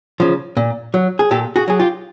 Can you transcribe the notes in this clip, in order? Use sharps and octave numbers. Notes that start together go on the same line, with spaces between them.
C#3 F3
A#2
F#3
G#4
A#2 G4 A4
F#4 G#4
F#3 G#4
F4 G4